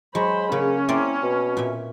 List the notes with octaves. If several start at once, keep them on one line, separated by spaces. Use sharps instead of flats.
F#3 G#3 C5 B5
C#3 A#3 C#4
A#3 C4 E4 D5
B2
A#2 E5